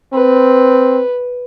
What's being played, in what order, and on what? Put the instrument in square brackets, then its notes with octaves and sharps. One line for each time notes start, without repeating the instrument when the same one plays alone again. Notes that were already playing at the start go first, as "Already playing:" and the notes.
[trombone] C4 [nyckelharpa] B4